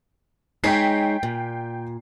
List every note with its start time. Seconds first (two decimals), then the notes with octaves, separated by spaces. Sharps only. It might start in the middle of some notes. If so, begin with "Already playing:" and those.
0.64 G#3 D#4 C#5 G5 B6 C7
1.23 A#2